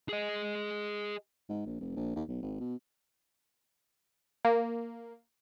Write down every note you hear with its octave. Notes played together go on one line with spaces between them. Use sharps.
G#4 D#5
G#2
A#1
F1
A#1
D#2
B1
G#1
B2
A#3